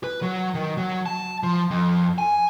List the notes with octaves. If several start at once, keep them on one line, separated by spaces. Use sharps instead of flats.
B4
F#3
D#3
F#3
A5
F3
F2
G#5